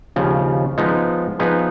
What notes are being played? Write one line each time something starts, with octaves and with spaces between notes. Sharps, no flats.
D#2 C#3 F3
F3 G#3 B3 D#4
F3 B3 D#4 G#4 B4